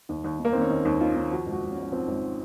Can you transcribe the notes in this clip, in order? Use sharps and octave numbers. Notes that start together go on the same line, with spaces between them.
D#2
D#2
D#3
A#3
D#3 C4
C#4
D#2 D#4
D#2
D#3 F4
D#3
F3 F#4
G#1
F#4
G#1
C#4
G#2
C#4
F3 C4
G#1